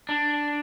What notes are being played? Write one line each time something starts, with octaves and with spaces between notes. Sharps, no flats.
D4